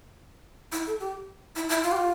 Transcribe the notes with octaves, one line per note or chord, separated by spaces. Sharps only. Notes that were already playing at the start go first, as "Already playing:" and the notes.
E4
A4
G4
E4
E4
F4
G4
F4